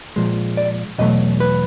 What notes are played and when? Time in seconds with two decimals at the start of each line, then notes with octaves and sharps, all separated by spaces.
0.16 A#2 F3 G#3
0.57 D5
0.98 E2 B2 F#3 A3 D#5
1.40 B4